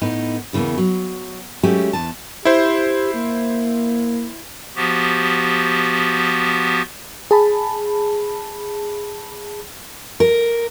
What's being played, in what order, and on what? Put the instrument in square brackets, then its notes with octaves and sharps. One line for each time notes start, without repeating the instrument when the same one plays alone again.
[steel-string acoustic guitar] A2 B3 D#4
E2 C#3 E3 A#3 B3
F#3
F#3 G#3 A3 C#4 F#4 G4
E2 A5
[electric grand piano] E4 C5 [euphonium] G4
[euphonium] A#3
[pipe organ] F3 B3 F#4 G4
[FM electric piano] G#4 A5 B5
[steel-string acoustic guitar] A#4